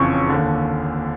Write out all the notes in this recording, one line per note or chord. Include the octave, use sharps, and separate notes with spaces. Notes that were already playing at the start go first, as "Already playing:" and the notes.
Already playing: F#1 F2 C#3 E3 C#6
D#2 D3